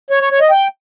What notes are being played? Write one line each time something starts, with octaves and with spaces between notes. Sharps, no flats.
C#5
C#5
C#5
D#5
G5